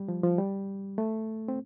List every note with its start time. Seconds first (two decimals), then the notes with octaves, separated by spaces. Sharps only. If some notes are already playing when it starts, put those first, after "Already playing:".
Already playing: G3
0.08 F3
0.23 F3
0.38 G3
0.98 A3
1.48 C4